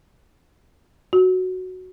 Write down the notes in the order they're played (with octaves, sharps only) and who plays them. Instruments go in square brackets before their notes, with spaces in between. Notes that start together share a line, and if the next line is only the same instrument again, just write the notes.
[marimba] F#4